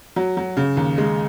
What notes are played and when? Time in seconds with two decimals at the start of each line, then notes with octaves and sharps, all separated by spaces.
0.16 F#3
0.37 F#3
0.57 C#3
0.77 D#2
0.98 G#3